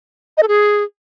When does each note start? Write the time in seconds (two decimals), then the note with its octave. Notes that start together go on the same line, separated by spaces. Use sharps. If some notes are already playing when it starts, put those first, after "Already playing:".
0.37 D#5
0.43 A4
0.48 G#4